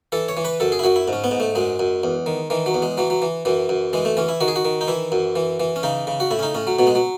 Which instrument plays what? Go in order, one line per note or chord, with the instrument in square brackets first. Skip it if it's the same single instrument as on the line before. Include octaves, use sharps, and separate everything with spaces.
[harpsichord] E3 A4
C#5
E3
B4
F#2 A4
G#4
E4
F#2 F#4
E4
G#2
C#4
B3
G#2
A3
F#2 G#3
F#2
E2
D#3
D#3 E3
F#3
E2
G#3
E3 F#3
F#3
E3
F#2 E3
F#2
E3 G#3
A3
E3 C#4
E4
D#3 F#4
G#4
F#4
D#3
D#4
E3 E4
F#2
E3
E3
C#4
C#3 D#4
C#3
F#4
A2 E4
C#4
D#4
A2 C#4
F#3
B2 F#3
G#3
F#3